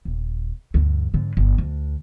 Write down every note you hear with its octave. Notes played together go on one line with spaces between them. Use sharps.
D#1
D2 G2
G#2 D3
G1
D2